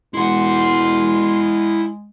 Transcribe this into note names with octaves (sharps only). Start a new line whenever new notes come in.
E1 G#3 E4 F#5 C6